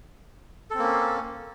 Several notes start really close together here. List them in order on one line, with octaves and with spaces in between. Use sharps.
A4 C4 A#3 C#4